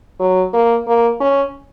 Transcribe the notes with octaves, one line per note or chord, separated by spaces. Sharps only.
F#3
A#3
A#3
C#4